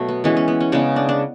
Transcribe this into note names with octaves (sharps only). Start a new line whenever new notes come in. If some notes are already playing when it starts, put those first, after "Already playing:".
Already playing: B2 F#3 A3
B3
E3 G#3 B3 C#4
C#4
B3
C#4
C#3 G#3 B3 D4
D4
D4